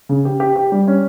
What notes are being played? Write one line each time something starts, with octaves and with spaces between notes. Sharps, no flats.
C#3
G4
G4
G4
G3
C#4